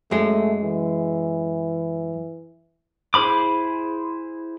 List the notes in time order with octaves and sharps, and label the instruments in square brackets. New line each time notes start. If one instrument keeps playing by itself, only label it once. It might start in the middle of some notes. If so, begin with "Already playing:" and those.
[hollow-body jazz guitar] F#2 G#3 [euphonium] A3
[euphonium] E3
[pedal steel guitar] E4 G#4 C5 B5 D6